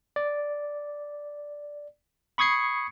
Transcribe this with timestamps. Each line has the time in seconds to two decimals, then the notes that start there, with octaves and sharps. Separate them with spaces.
0.16 D5
2.38 B5 C#6 D#6 G#6 C7 C#7